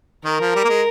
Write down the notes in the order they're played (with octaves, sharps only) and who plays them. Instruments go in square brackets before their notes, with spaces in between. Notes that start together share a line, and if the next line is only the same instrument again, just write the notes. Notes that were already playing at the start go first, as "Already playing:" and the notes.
[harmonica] D#3 [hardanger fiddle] A#4
[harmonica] F3
G3
A#3
G#3